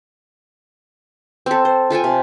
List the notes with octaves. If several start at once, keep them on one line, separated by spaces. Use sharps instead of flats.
C4 A4
C5
F4 A4 G5 G#5
C3